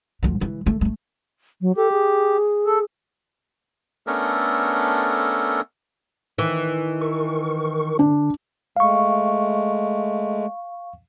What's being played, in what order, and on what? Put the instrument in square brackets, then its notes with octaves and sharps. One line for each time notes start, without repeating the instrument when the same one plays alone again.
[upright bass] D2 F3
C#3 E3
C#3 A3
G#3 A3
[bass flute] F#3
[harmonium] G4 [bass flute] A4
[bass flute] G#4
[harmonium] A4
[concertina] A3 B3 C#4 D4 A4 A#4
[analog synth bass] D#3 [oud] E3
[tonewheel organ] A#4 C#6
[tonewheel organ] D3 [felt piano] D4
[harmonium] G#3 A3 [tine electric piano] F5 C#6